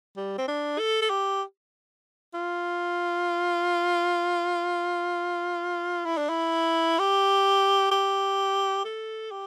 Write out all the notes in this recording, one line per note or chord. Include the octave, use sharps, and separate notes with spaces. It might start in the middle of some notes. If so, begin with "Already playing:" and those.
G3
C4
D4
A4
A4
G4
F4
E4
D4
E4
G4
G4
A4
G4